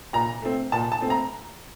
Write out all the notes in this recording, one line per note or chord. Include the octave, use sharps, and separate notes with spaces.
A#2 A#5
A3 C4
A#2 A5
A5
A3 C4
A#5